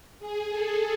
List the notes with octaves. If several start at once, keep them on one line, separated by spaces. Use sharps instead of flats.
G#4
A4